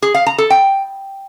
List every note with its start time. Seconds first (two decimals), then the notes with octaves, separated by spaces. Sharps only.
0.02 G#4
0.14 F5
0.26 A#5
0.38 A4
0.50 G5